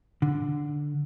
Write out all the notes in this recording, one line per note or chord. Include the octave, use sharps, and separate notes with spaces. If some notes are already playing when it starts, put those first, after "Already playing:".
D3